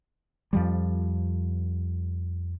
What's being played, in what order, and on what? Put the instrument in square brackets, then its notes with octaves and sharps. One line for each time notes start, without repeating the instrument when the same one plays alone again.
[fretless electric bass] F2 F3 G3